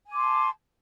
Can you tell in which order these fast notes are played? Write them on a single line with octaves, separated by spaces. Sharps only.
G#5 D6 C6 A5